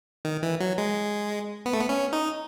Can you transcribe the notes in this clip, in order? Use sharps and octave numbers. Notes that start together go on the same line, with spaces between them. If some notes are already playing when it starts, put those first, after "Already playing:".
D#3
E3
F#3
G#3
B3
A3
B3
C#4
D#4